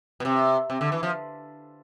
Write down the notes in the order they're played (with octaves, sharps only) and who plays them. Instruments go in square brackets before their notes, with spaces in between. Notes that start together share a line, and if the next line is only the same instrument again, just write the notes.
[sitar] B2
C3
C3
D3
E3
F3